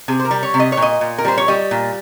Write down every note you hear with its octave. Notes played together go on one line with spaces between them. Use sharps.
C3 G#4
C5
A#4
G3
C#5
C3
D#5
C#5
A#2
D#5
A#2
A#4
G3 C5
C#5
G3 D#5
A#2